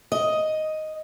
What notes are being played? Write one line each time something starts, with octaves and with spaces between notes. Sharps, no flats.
D#5